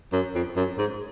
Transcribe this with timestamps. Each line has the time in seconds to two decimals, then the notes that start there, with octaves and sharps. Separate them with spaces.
0.13 F#2
0.35 F2
0.56 F#2
0.78 G#2